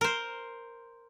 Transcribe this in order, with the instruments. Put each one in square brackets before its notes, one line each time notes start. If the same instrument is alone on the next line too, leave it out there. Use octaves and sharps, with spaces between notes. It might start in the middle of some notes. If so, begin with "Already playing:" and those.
[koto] A#4 C5